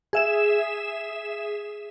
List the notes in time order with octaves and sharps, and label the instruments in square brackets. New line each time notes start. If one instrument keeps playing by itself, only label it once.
[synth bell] G#4 E5 E7